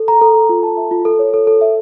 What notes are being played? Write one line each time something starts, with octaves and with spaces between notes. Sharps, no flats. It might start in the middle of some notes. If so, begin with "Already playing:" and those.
Already playing: A4
A#5
A4
A4
F4
A5
E5
F4
A4
C#5
A4
A4
E5